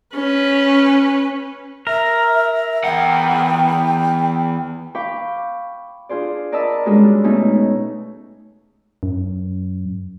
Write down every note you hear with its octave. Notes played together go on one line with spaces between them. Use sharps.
C#4 B4
A#4 E5
E2 F#5 G5
F5 G5 B5 C#6 D6
D4 F4 G#4 C5 D5
A#4 D5 D#5 A5 B5 E6
G3 G#3 C#4 D4 F#4 A4
B2 A3 C#4 D#4 G#4 A4
F#2